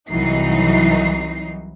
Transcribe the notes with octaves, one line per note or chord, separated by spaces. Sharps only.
C2 E3 F#3 D#4 C7